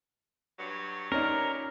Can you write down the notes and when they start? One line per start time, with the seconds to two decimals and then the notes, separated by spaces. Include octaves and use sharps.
0.59 G2 F#3
1.12 G2 A#2 C#4 D#4 A#4